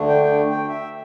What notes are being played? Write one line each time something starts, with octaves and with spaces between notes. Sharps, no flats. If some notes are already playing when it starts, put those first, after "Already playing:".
Already playing: D2 D3 A3 D4
G5
G5
G5
E5